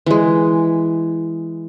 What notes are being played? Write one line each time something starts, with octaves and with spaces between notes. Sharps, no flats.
E3 G#3